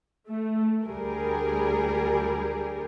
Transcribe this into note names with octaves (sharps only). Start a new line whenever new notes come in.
A3
D2 G3 G#4 A#4